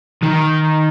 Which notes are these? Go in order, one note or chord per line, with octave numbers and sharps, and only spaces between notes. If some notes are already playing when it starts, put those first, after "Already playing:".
D#3